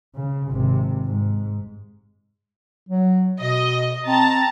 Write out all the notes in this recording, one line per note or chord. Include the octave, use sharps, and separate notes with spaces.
C#3
G#1 C3
G#2
F#3
B2 D#5
C4 A5 A#5 A6